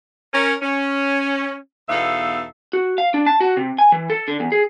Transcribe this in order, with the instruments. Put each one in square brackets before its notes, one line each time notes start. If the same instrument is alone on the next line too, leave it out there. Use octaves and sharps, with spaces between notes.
[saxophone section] C#4 A#4
C#4
E2 B2 D#4 A4 E5 F5
[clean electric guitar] F#4
F5
D4
A5
F#4
C3
G#5
E3
A4
D3
E2
G#4